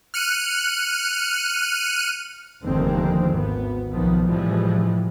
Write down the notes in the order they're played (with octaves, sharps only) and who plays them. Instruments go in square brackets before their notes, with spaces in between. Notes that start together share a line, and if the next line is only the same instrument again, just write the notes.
[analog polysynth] F6 F#6 C#7 D#7
[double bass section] F1 D#2 D3 D#3 G#3 C4
G#1 B3
B1 D#3 F3 B3
A2 C3 E3 F3 G3 G#3